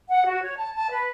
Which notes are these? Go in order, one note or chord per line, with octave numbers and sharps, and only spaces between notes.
F#5
F#4
C#5
A5
A5
B4